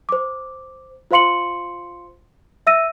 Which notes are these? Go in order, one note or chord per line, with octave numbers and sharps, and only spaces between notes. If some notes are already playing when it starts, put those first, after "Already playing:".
C5 D6
F4 C5 F5 C6 C#7 F#7
E5 E6 A#6 D#7